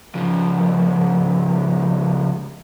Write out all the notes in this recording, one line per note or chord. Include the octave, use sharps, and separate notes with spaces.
C#2 F3